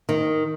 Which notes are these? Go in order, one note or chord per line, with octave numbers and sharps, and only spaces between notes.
D#3